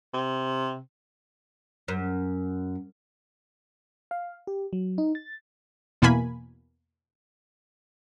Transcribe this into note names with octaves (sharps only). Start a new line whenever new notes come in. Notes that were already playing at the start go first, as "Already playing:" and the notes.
C3
F#2
F5
G4
F#3
D#4
A6
E2 B2 E3 A#3 G#5 B5